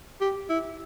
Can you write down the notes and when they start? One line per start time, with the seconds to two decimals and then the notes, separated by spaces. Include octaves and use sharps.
0.21 G4
0.49 E4